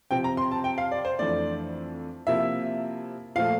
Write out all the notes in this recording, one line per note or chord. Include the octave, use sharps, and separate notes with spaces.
C3 F3 C4 G5
A#5
C6
A5
G5
F5
D5
C5
F2 E3 A3 D4 D5
C3 F3 A#3 E4 E5
A#2 F3 A3 F5